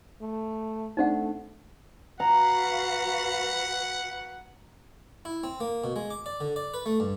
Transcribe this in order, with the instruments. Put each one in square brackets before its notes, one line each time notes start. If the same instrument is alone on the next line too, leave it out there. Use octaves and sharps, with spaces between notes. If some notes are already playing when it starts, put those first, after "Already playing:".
[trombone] A3
[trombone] A3 [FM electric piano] C4 D4 [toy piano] D#4 C5 F#5
[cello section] F#4 B4 F5 [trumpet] F#5 [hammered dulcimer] A#5
[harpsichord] E4
C4
A#3
B2
G#3
D6
D5
D3
D5
B4
A3
G2